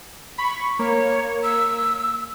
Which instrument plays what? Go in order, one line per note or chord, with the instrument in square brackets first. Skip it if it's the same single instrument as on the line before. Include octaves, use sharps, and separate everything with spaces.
[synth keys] B5 [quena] C#6
[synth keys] A#3 [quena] C#5
[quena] E6